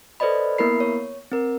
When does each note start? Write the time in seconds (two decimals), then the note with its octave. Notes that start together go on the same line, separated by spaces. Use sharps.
0.20 A4 B4 C5 D5 D#5 B5
0.58 A#3 B3 E4 A#4 B5 C7
0.80 C#5
1.32 C4 A#4